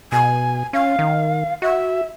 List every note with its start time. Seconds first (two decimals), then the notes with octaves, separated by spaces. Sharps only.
0.12 B2 G#5
0.73 C#4 F5
0.99 D#3
1.62 F#4 E5